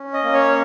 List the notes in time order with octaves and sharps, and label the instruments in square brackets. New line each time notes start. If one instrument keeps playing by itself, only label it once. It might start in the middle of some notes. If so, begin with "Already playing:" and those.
Already playing: [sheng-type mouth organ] C#4
D#5
A#3
C#5